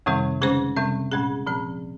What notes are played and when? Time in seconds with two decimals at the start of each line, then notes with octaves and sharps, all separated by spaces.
0.06 F2 C3 D#3 G3 C4
0.42 C#3 G#3 C#4 G#4 C5
0.77 C3 G3 C4
1.12 A#2 G#3 C#4 G#4
1.46 A#2 F3 C4